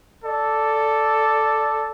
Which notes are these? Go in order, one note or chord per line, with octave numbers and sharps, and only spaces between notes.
A4 D5